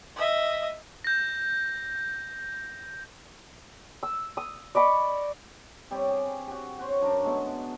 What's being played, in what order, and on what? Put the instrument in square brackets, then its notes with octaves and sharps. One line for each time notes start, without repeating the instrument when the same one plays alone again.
[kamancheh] D#5 E5
[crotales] G6 A#6
[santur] E6
D#6
D5 D#5 B5 C#6
[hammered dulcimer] G3 C4 G4 C#5
G4 G#4
F#4 G4
F#4 C5 C#5
F#2 D4 A#4 C#6
B2 G#3 A3